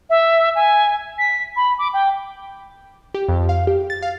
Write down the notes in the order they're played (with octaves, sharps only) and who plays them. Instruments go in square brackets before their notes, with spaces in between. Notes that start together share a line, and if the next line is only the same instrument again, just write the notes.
[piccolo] E5
G#5
B6
B5
D6
G5
[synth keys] G4
F2
F5
G4
A6
F5